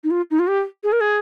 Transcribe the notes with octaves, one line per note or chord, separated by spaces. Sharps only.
D#4
F4
D#4
F4
G4
G#4
A#4
G#4